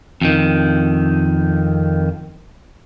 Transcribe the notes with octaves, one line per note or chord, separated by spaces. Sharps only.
F2 D#3